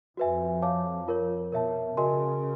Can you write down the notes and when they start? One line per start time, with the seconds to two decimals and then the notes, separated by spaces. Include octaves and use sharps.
0.17 F2 F#4 B4 E5 G#5
0.62 C#5 F5 A5 D6
1.08 F4 A#4 C#5
1.52 B2 A#4 C#5 E5 A5
1.97 C#3 F#4 A#4 D#5 G#5 C6